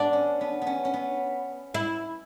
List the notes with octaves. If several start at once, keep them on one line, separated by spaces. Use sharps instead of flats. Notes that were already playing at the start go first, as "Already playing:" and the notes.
Already playing: B3 D4
C#4
B3
B3
C#4
C#4
B3
E4